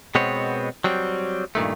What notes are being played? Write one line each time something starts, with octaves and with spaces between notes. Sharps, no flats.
B2 G#3 B3 C4 C#5
F#3 G3 C4
G2 A#2 D#3 A3